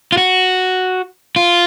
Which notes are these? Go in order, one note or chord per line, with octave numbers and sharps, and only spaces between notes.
F4
F#4
F4